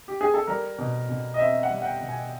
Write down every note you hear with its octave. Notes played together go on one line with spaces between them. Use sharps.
G4
G#4
A4
G3 A#4
B2
B2
D#5
C4 E5
F#5
G3
F#5
G5
B2
G#5